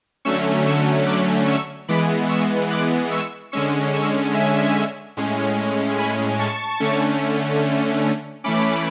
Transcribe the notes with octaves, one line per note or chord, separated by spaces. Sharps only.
D3 F#3 A3 C#4 C#6 E6
C#6 E6
D6 F#6
C#6 E6
E3 G#3 B3 B5 D6
C#6 E6
D6 F#6
C#6 E6
D3 G#3 C#4 C#6 E6
C#6 E6
E5 G#5
A2 G#3 C#4
G#5 B5
A5 C#6
D3 A3 C#4
E3 A3 C#4 B5 D6